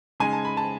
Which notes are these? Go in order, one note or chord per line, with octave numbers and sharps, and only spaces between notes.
C#3 G#3 D#4 G#5
A5
B5
A5